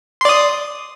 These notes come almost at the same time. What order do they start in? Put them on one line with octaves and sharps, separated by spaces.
C6 D5 D#6